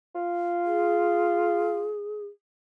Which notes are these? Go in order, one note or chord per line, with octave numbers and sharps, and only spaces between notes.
F4
G#4